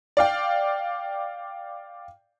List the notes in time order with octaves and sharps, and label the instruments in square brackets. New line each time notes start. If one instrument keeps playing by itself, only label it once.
[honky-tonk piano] D5 F5 G5